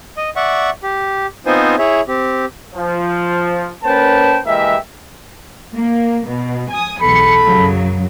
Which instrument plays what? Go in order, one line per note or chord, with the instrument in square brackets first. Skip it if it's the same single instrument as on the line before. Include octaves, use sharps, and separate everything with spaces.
[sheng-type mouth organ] D#5
D5 E5 F#5 C#6
G4
B3 C4 D#4 F4 C5 G#5
E4 G#4 C#5 E5
C4 G4
[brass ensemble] F3
A#3 C#4 B4 C5 G5 A5
E3 G#3 A#3 G4 E5
[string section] A#3
B2
G#5 D#6
[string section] B1 E2 C#7 [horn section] A4 B5
[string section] F#2 C#3 F#3